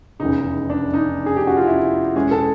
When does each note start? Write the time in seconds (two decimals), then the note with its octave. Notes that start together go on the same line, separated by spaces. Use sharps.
0.20 F1 E2 C#3 D#4
0.70 D4
0.94 D#4
1.26 G#4
1.36 G4
1.47 F#4
1.57 F4
1.67 E4
2.16 E2 B2 G#3 C#4 G#4
2.31 A4